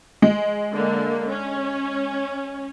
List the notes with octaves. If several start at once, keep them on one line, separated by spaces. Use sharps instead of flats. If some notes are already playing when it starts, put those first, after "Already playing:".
G#3
D3 A#3
C#4